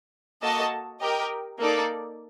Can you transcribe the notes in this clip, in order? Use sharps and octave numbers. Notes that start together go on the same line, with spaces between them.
A#3 F#4 A4 D#5 A5
G4 A#4 D#5 G5
A#3 D#4 A4 D5